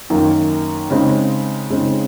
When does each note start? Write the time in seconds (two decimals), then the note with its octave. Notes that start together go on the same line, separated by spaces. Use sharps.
0.10 F#2 D#3 A#3
0.90 C#3 G#3 C4 D#4
1.70 C#3 G#3 C4 D#4